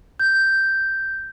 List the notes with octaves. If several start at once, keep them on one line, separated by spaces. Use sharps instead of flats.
G6